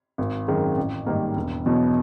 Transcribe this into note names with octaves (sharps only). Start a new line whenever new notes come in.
G#1
F#2 D#3 G#3 C4
A1
G#2 D#3 G3 A#3
E1
E2 B2 F#3